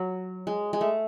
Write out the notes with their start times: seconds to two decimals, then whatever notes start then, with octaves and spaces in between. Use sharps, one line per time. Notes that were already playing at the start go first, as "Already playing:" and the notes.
Already playing: F#3
0.47 G#3
0.73 G#3
0.81 A3